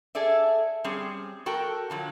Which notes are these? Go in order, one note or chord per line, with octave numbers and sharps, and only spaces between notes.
G#4 A4 D5 E5
G3 C4 C#4 G#4
F#4 A4 A#4 G5
D3 F3 F#3